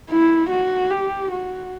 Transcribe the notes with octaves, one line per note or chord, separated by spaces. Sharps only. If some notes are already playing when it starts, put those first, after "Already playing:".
E4
F#4
G4
F#4